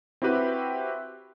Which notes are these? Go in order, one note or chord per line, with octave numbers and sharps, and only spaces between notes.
C4 E4 F#4 G4 B4